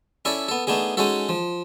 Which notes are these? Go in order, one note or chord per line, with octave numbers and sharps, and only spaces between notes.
C#4 E4 A4 D5
B3 A4
A3 B3 D4 D#4 G#4
G#3 C#4 D#4 F#4 A4
F3